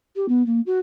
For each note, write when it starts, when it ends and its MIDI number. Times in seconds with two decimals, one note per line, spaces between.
0.15 0.26 67
0.28 0.45 59
0.46 0.60 58
0.66 0.79 66